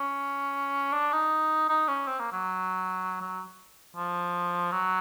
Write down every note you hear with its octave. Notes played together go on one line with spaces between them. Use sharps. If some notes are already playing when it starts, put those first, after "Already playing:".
Already playing: C#4
D4
D#4
D#4
C#4
C4
A#3
F#3
F#3
F3
F#3